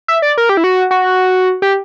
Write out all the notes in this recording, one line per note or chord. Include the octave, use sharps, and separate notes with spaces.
E5
D5
A#4
G4
E4
F#4
F#4
G4